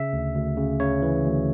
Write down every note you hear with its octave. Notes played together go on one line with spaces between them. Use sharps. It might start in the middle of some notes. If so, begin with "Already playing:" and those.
Already playing: C#3 E5
D2
D2
C#3
C#3 C#5
E3
D2